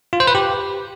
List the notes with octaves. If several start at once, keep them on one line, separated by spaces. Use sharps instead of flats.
F4
C5
B4
G4